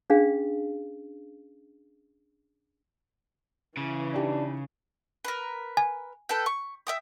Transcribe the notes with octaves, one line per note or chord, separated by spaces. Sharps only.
C#4 D4 G#4 F5
C#3 E3
D4 D#4 G4
A#4 B4
G#5
A4 B4 G5
C#6
E5 G5 D#6